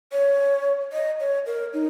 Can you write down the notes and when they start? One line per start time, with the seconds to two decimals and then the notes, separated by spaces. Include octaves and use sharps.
0.12 C#5
0.92 D#5
1.20 C#5
1.46 A#4
1.74 D#4